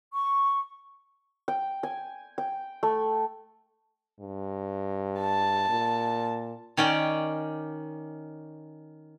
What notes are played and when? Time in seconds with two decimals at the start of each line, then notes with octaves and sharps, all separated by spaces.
0.12 C#6
1.48 G5
1.83 G#5
2.38 G5
2.83 A3
4.20 G2
5.21 A5
5.69 A#2
6.77 D#3 C#4 D5 G5